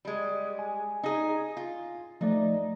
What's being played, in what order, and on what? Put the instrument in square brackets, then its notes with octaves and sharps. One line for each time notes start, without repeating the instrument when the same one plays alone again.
[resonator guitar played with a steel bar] G3 G#3
[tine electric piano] G#5
[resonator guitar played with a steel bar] D#4 G#4
F4
[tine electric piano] F3 A3 D5 [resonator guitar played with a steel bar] D#4